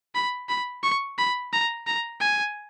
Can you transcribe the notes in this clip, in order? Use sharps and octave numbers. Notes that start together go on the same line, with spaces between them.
B5
B5
C#6
B5
A#5
A#5
G#5